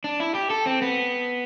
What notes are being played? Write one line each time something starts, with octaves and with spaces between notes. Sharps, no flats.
D4
E4
G4
A4
C4
B3